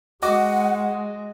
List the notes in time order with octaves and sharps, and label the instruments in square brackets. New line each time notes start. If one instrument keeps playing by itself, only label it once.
[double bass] G#3 [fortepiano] F#4 D#5 D6 [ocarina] F#5